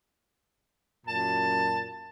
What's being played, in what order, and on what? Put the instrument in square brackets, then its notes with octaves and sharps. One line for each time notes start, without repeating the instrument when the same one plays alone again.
[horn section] F#2 A#2 A5